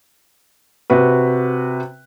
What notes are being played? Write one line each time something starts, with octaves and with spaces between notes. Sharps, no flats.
C3 F#4 B4